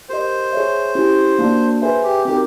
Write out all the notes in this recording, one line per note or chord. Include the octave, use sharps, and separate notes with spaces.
G4 A#4 C5 D#5
G#4 C#5 E5
C#4 E4 G4
A#3 D4 F#4
G#4 B4 C5 E5 G#5
G4
C4 D#4 F#4 G4 A#4